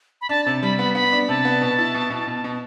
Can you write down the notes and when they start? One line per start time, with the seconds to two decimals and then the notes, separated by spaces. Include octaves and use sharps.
0.21 B5
0.29 D4 A5
0.45 C3 A5
0.62 G3 B5
0.79 B3 B5
0.95 B3 B5
1.12 D4
1.29 C3 A5
1.45 B3
1.62 B2
1.79 E4
1.94 B2
2.10 B2
2.27 B2
2.44 B2